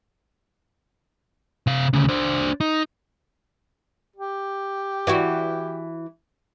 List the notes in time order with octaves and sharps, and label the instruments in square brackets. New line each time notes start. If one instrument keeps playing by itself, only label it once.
[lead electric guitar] C3 F5
D2 C#3
D4 C5
D#4
[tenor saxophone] G4
[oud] E3 E4 F#4